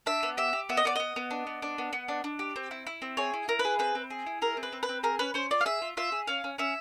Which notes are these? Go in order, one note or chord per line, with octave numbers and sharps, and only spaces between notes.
D4 E5
B3
G4 E5
G4
B3 E5
D#5
B3 D5
B3 D#5
B3
D4
B3
D4
B3
B3
D4
D4
G4
C4
E4
E4
C4
G#4 C#5
E4
E4 A#4
B4
G#4
C4 B4
C4
G#4
E4
G#4 A#4
C4
B4
C4
B4
C4
G#4 A#4
C#4 B4
C#4 C5
F4 D5
F5
G#4 E5
F4
F4 E5
G#4
C#4 F5
C#4
C#4 E5